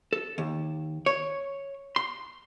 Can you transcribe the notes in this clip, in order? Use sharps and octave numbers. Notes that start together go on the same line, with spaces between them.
A4
D#2
C#5
C6